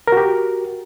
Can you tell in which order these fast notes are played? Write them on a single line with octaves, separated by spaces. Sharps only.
A#4 F#4 G4